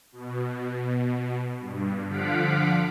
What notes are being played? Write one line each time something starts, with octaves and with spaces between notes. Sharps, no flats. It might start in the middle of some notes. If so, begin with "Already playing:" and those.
B2
G2
D3 F3 F5 F#5 B6 D7